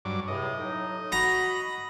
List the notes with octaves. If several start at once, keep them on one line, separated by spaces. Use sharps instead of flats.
G2 F#3 D6
C#2 A2 C3 D#5
A2 F#3 D#4
F#4 A#5 B5